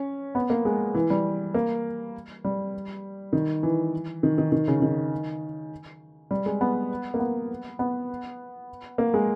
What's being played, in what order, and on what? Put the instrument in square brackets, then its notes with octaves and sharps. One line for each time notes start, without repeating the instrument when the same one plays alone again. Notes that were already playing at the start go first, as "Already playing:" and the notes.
Already playing: [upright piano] C#4
B3
A#3
G#3
E3
G3
A#3
G3
D#3
E3
D#3
D#3
D#3
C#3
D#3
G3
G#3
B3
A#3
B3
B3
A#3
G#3